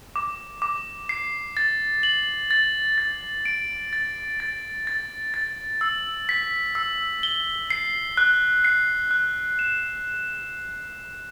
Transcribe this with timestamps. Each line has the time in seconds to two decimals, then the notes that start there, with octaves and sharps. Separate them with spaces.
0.16 D6
0.62 D6
1.09 C7
1.57 A6
2.03 F#7
2.51 A6
2.98 A6
3.45 D7
3.93 A6
4.40 A6
4.87 A6
5.34 A6
5.81 E6
6.29 B6
6.75 E6
7.23 G7
7.70 C7
8.17 F#6
8.65 C7
9.11 F#6
9.59 E7